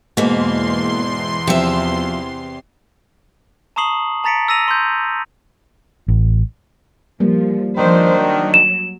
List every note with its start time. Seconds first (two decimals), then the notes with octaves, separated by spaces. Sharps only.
0.17 E2 G#2 B2 E3 A#3 C6
1.47 C3 F3 E5
3.76 A5 A#5 C#6 D#6 C7 F#7
4.24 A5 A#5 A6 B6 C#7 D7
4.48 E6 A6 A#6 D#7 F7
4.68 C6 G6
6.08 A1
7.20 F3 G3 A#3
7.77 D#3 F3 D4 C5
8.17 F#3
8.54 E7